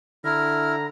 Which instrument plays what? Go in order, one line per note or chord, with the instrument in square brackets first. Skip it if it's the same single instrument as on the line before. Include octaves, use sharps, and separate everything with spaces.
[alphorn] D3 [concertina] E4 [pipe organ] A#5 [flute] F6